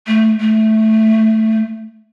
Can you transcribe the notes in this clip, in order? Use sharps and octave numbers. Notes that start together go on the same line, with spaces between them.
A3
A3